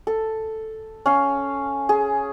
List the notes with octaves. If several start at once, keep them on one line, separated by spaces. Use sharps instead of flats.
A4
C#4 F5
G#4